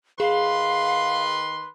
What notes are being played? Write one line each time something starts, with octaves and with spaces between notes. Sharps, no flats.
D#3 G#4 B4 F5 C6